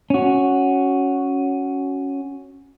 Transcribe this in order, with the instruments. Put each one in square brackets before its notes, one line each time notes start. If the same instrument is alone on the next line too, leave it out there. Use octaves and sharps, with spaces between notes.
[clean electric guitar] C#4 F#4